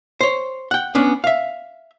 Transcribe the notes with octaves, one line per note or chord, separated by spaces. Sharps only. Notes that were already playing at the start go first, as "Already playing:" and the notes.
C5 C#5
F#5 G5
B3 C#4 D4
E5 F5